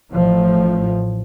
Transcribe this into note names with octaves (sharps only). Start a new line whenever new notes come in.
A1 A2 F3